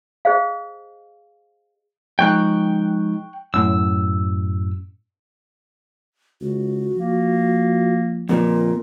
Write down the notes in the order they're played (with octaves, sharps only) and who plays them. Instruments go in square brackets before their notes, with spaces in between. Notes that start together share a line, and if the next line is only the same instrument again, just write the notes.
[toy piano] G#4 C5 D#5 F5
[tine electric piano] F3 G#3 D#4 [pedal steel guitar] G5 C#6 F#6
[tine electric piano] F#2 A2 [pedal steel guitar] E6
[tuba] C#2 [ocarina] F#4
[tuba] F3 [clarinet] A#3
[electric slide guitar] F2 A#2 [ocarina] A#4